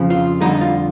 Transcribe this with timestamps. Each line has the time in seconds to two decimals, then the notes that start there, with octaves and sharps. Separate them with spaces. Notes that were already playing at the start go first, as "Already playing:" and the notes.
Already playing: F2 C#3 F3
0.10 F4
0.41 F2 D3 G3 D#4
0.61 F4